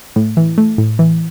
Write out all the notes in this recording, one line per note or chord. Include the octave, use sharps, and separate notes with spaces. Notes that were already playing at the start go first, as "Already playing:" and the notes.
A2
E3
A3
A2
E3